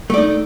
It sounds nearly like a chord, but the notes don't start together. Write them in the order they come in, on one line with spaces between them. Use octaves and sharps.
A3 D5 D#4